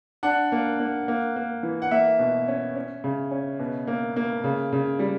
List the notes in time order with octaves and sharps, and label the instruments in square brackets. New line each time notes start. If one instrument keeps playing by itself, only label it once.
[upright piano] D4 F#5
A#3
A#3
A#3
A#3
E3
F#5
A#3 E5
B2
C#4
C#4
C#3
C#4
B2
A#3
A#3
C#3
C#3
G3